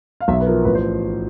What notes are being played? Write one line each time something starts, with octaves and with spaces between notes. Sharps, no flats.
F5
B1 E5
B4
F3 A#4
A1 B4
C5